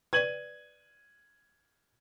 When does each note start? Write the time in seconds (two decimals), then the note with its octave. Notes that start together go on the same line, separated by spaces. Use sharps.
0.13 B4 D5 G#6 D#7 F#7